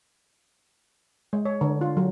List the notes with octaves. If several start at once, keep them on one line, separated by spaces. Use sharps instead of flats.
G#3
C#5
D3
F4
F#3